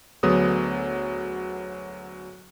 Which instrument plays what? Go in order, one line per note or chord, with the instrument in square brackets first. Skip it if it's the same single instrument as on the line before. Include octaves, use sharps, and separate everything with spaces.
[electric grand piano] D2 D3 F#3 B3 G#4 D#6